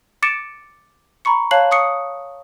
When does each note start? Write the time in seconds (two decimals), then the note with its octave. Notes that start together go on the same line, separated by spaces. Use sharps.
0.22 D6 A6 C#7 D7 E7
1.25 A#5 B5 C#6 C#7
1.51 C#5 F5 A5 F#6 C7 F#7
1.71 C#6 D#6 C7 C#7